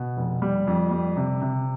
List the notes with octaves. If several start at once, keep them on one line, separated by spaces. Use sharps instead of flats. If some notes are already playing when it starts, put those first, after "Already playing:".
Already playing: B2
F1
G3
F2
G3
C3
C3